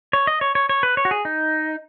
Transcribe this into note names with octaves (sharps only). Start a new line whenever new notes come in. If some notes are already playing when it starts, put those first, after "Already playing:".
C#5
D#5
C#5
C#5
C#5
B4
C#5
F#4
G#4
D#4